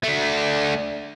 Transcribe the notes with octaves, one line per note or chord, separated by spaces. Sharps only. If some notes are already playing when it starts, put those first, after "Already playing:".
A3 D4